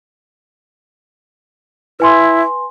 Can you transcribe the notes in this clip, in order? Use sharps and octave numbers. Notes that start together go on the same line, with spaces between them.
E4 B4 G#5 C6